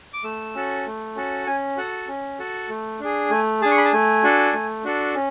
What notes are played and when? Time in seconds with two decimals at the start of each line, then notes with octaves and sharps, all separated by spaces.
0.13 D6
0.24 A3 E6
0.55 C#4 F#4 A4
0.86 A3
1.16 C#4 F#4 A4
1.47 C#4 G#5
1.77 F#4 A4 F#5
2.08 C#4
2.39 F#4 A4
2.69 A3
3.00 D4 G#4
3.30 A3 G#5
3.61 D4 G#4 A5
3.71 C#6
3.78 B5
3.85 A5
3.93 A3 G#5
4.24 D4 F#4 A4
4.53 A3
4.84 D4 F#4 A4
5.15 C#4